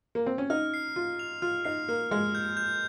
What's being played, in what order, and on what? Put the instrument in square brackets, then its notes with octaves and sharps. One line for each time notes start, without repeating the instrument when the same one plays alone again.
[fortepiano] A#3
C4
C#4
[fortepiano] D#4 [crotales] F6
[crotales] C7
[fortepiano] F4 [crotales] F6
[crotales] F7
[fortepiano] F4 [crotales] F6
[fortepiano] D#4 [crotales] C7
[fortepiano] A#3 [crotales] F6
[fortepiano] G#3 [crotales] F6
[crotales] G6
G6